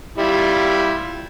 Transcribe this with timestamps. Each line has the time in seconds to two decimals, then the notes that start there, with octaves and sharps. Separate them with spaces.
0.18 G3 E4 F4